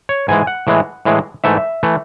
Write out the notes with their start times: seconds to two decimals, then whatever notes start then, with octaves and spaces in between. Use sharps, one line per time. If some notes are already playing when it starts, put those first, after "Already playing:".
0.09 C#5
0.28 G#2 E3 G#3 G#5
0.47 F#5
0.67 A2 E3 G#3
1.05 A2 E3 G#3
1.44 G#2 E3 A3 E5
1.83 E3 A3